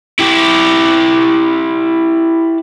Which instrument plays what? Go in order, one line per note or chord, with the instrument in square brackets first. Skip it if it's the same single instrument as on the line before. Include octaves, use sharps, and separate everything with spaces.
[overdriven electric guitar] E4 G4